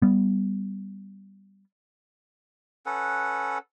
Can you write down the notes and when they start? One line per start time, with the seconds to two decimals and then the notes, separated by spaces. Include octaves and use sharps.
0.02 G3 B3
2.86 C#4 A4 B4 F#5